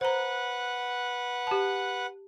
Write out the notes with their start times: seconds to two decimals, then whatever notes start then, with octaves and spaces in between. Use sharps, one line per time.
0.01 B4 C5 F#5 A#5
1.47 G4 A5